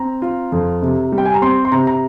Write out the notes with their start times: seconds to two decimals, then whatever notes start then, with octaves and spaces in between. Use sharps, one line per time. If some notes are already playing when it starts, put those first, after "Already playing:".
Already playing: C4 A#5
0.22 F4
0.52 F2
0.82 C3
1.12 G3
1.18 G5
1.26 G#5
1.34 A#5
1.42 C4 C6
1.65 C6
1.72 C3 A#5
1.87 A#5